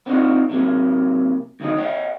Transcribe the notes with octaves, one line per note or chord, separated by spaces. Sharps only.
B3 C4 D4 D#4 F4 F#4
C3 F#3 A#3
D2 D#3 F#3 D#5
C#5 D#5 F#5 G5